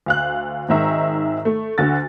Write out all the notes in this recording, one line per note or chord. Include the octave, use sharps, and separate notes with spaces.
D2 F5 F#6
G#1 G#2 D#3 G#3 E5 A#5
A3
D2 D3 F#4 A6